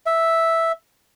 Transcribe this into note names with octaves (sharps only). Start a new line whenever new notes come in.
E5